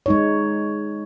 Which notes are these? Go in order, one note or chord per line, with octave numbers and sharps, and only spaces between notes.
G#3 D#4 C#5